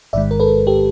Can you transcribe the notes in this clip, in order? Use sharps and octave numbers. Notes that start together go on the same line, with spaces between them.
A1 G#2 D#3 G#3 D5 E5
A#4
A4 B4
G4 A4